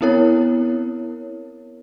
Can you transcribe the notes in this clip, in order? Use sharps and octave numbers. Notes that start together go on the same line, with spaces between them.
B3 C4 E4 A#4 C#5